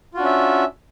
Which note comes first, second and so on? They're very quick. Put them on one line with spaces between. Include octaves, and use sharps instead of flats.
F4 F#4 D4 C#4 E5